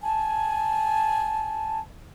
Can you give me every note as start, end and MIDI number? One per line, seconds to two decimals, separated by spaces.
0.02 1.79 80
0.02 1.79 81